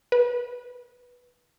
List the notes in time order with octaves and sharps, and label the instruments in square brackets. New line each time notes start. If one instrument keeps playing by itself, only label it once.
[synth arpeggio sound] B4